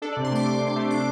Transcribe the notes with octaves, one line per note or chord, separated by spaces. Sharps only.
D4 A4
D5
C3
C6
A3 D6
A3 C6
C3
C6
A3
D4 D6